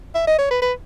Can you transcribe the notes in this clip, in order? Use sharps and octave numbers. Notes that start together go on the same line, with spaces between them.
E5
D#5
C#5
B4
B4